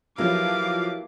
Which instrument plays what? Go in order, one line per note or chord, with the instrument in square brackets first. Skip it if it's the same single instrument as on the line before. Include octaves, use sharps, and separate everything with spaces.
[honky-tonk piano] F3 F#3 [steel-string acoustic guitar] A#3 E4 G4 [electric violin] B4 D6 [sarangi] F5